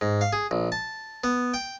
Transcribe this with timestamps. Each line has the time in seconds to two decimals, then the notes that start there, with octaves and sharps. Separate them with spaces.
0.01 G#2
0.21 F5
0.33 G#4
0.51 A#1
0.72 A5
1.24 B3
1.54 G5